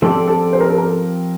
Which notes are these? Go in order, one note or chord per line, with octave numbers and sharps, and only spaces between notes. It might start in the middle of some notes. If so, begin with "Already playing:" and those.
F3 C4 G4 A4 D5
A4
C5
A#4
A4
A#4